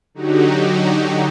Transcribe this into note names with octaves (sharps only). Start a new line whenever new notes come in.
D3 F#3 D#4 F#4 G4